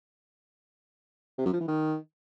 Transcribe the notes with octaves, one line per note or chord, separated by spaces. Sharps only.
C3
F#2
F3
E3
D#3